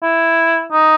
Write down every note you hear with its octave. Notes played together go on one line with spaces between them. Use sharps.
E4
D#4